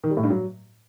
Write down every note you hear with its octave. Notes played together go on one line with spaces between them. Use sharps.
D#3
G3
A2
G2
F#3